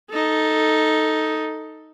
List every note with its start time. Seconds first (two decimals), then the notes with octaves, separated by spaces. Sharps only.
0.11 D#4 A4